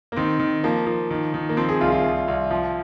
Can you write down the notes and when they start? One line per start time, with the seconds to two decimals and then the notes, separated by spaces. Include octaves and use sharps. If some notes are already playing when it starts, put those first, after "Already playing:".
0.12 A#3
0.16 D#3 C4
0.40 D#3
0.64 F3 A#3
0.86 F3
1.10 D#3
1.34 D#3
1.49 A#3
1.57 F3 C4
1.69 G#4
1.81 C2 F4
1.92 F4
2.04 C2
2.28 C2
2.51 F3